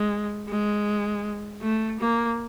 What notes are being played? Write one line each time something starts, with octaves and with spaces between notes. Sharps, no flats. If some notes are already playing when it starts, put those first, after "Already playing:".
Already playing: G#3
G#3
A3
A#3